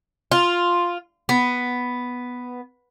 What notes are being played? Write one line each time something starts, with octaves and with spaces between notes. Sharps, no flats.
F4
B3